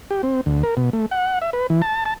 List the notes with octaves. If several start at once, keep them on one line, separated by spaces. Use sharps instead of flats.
G4
C4
D2
A#4
B2
A3
F#5
E5
B4
E3
A5
A5